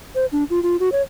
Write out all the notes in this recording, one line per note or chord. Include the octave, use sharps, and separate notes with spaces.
C5
D4
F4
F4
F#4
C#5